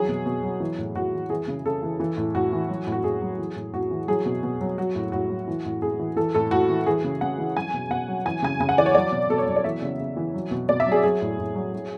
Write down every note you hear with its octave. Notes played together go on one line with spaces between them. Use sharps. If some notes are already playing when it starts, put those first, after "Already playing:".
Already playing: E3 F#3 G#4
B2
B2
F#3
E3
A2
A2 F#4
E3
E3 G#4
C#3
C#3 A4
E3
E3
A2
A2 F#4
E3
F#3
A2
F#4
A2 G#4
F#3
E3
A2
A2 F#4
E3
F#3 G#4
B2
B2
F#3
F#3 F#4
A2
A2 F#4
F#3
E3
A2
A2 G#4
E3
E3 A4
A2 A4
A2 F#4
E3
E3 G#4
C#3
C#3 F#5
E3
F#3 G#5
B2
B2 F#5
F#3
E3 G#5
C#3 G#5
C#3 G#5
F#5
E3 D5
C#5
F#3 D5
B2
B2 A4
C#5
F#3
D5
E3 E5
C#3
C#3
E3
F#3
B2
B2 D5
E5
F#3
G#4
F#3 G#4
A2
A2
F#3
F#3